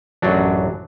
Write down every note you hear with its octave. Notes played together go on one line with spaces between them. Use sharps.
A1 F#2 F#3 D4